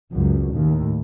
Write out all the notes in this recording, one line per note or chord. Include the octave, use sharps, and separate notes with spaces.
C#2 F#2
D#2 A2